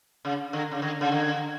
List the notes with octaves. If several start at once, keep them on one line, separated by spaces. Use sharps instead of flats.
C#3
D3
C#3
D3
C#3
D3